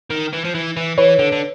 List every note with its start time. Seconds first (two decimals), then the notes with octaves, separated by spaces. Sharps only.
0.10 D#3
0.33 E3
0.44 F3
0.55 E3
0.76 E3
0.98 E3 B4 C#5
1.19 D3
1.32 D3